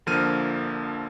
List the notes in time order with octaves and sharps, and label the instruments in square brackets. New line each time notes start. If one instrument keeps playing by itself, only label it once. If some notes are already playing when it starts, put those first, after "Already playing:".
[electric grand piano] A#1 D3 F3 A#3 F6 D#7